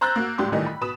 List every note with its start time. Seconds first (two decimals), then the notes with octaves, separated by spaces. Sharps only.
0.01 C5 A#5 E6 F#6 G6 A6
0.16 A#3 F#4
0.38 C#2 A2 G3 G4 C6 D6
0.52 A#2 D#3 E3 G3 A3 D#4
0.66 B5
0.81 B2 B4 B5 D#6 E7